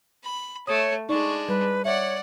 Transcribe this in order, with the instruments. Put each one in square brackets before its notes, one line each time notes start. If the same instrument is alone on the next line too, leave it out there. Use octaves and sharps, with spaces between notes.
[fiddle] B5
[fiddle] A3 [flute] C#5 [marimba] D#6
[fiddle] G#3 D4 [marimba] D#4 D5 [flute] C#6
[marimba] G3 [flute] B4
[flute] C#5 [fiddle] D5 F#5 [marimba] E5